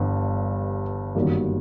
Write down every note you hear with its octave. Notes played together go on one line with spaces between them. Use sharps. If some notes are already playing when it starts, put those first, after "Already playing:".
Already playing: G1 G2 E3
G1 F#2 D#3 G3 A#3